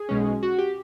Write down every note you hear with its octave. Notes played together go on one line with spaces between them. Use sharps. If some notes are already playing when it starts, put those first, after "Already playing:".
Already playing: G#4
B1 B2 G#3 C#4
F#4
G4